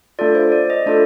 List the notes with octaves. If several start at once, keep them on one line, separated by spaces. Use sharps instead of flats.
A3 D4 F4 A4 D5
C5
D5
D#5
A3 D4 F4 A4 D5